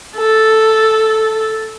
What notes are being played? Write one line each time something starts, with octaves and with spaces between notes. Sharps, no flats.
A4